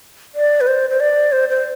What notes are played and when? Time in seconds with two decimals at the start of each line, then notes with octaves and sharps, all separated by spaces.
0.35 D5
0.61 B4
0.67 C5
0.90 C5
1.00 D5
1.32 C5
1.49 C5